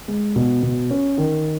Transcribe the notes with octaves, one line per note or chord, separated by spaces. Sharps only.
G#3
B2
B2
C#4
D#3